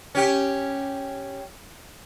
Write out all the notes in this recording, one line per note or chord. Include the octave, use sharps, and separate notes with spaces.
C#4 G4